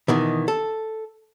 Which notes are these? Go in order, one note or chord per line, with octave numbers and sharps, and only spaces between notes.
B2 D#3 E3
A4